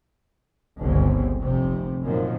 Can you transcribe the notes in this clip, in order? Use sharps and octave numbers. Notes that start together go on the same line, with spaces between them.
G1 C#2 E3 C4
F1 C3
F#2 A#2 D#3 F3